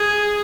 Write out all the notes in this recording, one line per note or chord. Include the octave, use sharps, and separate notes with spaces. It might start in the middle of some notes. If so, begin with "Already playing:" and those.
Already playing: G#4